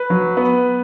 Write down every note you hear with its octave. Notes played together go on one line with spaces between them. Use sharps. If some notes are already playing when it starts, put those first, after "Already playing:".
Already playing: B4
F#3
B3